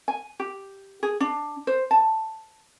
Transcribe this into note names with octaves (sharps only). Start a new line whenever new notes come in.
G#5
G4
G#4
D4
C5
A5